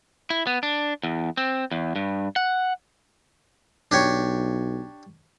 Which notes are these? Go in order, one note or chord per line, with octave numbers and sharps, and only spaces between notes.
E4
B3
D4
E2
C4
E2
G2
F#5
B1 D4 G4 C#5